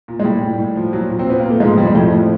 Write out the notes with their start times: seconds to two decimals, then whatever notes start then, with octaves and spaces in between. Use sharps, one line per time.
0.08 A#2
0.19 G#3
0.24 A2 G3
0.41 A2
0.58 A2
0.76 F3
0.93 A#2 F#3
1.10 A#2
1.19 C4
1.27 A#2 B3
1.40 A#2 A#3
1.50 A3
1.60 G#2 F3 G#3
1.78 F2 G3
1.87 G#3
1.95 F2 A2 A3
2.11 F3